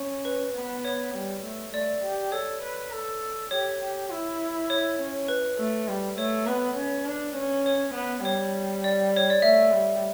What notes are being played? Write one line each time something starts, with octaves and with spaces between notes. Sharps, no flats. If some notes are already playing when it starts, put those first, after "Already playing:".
Already playing: C#4
B4
B3
C#5
G3
A3
A3 D5
G4
A4 C#5
B4
A4
G4 C#5
G4
E4
C#5
C#4
B4
A3
G3
A3 C#5
B3 B4
C#4
D4
C#4
C#5
B3
G3 C#5
D5
C#5
D5
A3 E5
G3